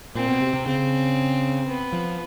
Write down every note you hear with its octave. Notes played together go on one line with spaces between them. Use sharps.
A#2 C4
B2
C3
C3
C#3 C4
B3
F3